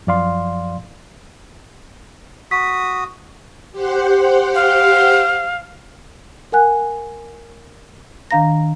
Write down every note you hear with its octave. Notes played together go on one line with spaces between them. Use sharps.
F#2 F3 D5 F5 C6
F#4 D#6 B6
G4 C5 F#5
F5
A#4 F#5 G#5 F#6
D#3 D4 F5 A#5 A#6